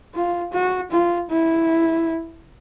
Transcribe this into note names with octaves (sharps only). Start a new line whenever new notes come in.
F4
F#4
F4
E4